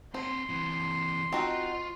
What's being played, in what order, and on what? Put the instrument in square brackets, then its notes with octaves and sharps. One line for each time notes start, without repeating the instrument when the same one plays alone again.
[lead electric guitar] C4 C#5 [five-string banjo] C5 [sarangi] C6
[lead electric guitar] E3 C4
[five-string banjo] C4 D#4 [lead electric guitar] F4 [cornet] F#4